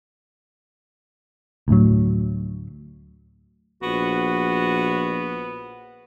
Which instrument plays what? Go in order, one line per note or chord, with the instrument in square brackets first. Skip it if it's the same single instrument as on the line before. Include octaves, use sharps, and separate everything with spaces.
[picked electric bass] D2 A2 F#3
[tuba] A#1 [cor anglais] B3 [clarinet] F#4